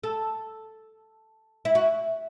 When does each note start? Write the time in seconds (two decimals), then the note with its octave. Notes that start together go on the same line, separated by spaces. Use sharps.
0.03 A4
1.65 E4
1.75 F#4